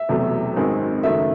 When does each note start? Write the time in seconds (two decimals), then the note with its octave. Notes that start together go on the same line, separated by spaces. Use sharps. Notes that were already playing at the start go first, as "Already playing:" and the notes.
Already playing: E5
0.09 E1 E2 C3 F#3 A3
0.56 G#1 F#2 D#3 G#3 C4
1.03 F#1 F#2 D#3 A3 E5